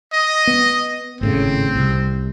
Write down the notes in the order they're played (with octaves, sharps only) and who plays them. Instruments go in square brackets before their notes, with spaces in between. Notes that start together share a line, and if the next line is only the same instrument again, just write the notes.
[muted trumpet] D#5
[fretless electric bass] B3
[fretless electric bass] G#1 A2 C#3 [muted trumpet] C4
[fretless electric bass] C2